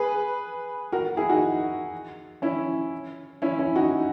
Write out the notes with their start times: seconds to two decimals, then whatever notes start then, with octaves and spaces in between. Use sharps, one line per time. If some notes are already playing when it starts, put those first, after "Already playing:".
Already playing: G#4 B4
0.92 F#4 A#4
1.17 E4 G#4
1.30 D#4 F#4
2.42 C#4 E4
3.42 C#4 E4
3.59 C#4 E4
3.76 D#4 F#4